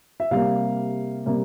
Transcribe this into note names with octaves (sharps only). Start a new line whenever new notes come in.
E5
C3 G3 A#3 F5
C3 G3 A#3